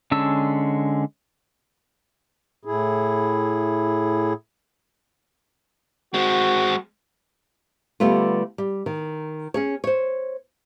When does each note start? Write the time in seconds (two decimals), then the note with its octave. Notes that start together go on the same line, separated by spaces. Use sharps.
0.11 D3 G#3 C#4 A5 E6
2.65 A2 E4 G#4
6.14 G#3 C4 F#4
8.00 D3 G3 A3 B3 F4
8.58 G3
8.86 D#3
9.54 C#4 G#4 C#5
9.84 C5 C#5